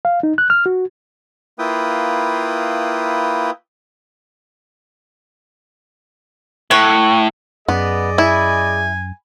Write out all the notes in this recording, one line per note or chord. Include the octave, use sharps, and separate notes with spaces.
F5
D#4
F#6
F6
F#4
A#3 E4 F4 B4 G5 D#6
A2 C#5 F#5
F#2 B3 G#4 D5 D#5
E4 G#5